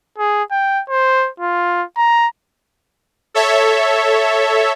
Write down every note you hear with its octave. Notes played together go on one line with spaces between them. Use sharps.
G#4
G5
C5
F4
A#5
A4 C#5 E5